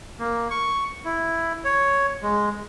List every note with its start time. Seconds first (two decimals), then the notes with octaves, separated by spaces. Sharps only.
0.19 A#3
0.51 C#6
1.05 E4
1.64 C#5
2.23 G#3